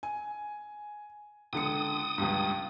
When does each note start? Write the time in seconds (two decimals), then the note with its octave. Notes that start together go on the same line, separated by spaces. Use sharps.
0.03 G#5
1.53 C#2 D3 D#6 C#7
2.18 C#2 G2